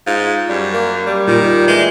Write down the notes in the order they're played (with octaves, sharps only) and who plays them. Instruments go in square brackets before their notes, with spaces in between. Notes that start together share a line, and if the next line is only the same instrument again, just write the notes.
[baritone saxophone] G#2 [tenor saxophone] F4
[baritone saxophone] F#2 [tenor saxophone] G3
[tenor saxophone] A#3
G3
[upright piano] A#2 [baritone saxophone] D#3
[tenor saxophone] E3 [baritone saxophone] G#3